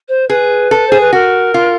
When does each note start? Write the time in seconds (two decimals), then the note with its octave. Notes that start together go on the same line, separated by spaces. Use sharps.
0.08 C5
0.29 G#4 B4
0.71 A4
0.87 G#4 C5
1.00 B4
1.13 F#4 A#4
1.54 F4